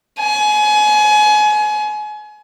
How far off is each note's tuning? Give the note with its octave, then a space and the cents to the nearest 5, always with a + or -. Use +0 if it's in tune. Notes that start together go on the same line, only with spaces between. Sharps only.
G#5 +30